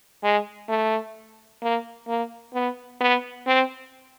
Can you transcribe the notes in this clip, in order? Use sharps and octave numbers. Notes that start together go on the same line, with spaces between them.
G#3
A3
A#3
A#3
B3
B3
C4